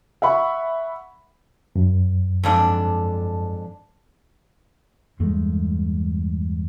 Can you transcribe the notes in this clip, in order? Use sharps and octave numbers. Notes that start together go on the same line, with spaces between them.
E5 F#5 B5 C#6
F#2
F2 G#2 D4
E2 G2 G#3 A3